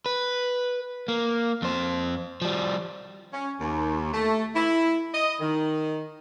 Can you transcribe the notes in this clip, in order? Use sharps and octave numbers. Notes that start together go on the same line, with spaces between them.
B4
A#3
F2 C5
F3 G3
C#4
D#2
A3
E4
D#5
D#3